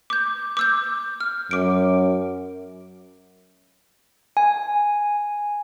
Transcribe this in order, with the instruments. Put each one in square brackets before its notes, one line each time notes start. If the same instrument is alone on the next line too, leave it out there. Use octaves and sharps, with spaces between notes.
[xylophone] D6 G6
D6 E6 G6
F6
[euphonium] F#2 [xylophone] D6 D7
[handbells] G#5